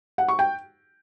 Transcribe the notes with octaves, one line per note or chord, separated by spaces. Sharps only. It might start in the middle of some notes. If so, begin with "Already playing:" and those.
F#5
C#6
G5